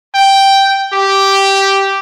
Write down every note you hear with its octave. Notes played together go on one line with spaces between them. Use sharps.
G5
G4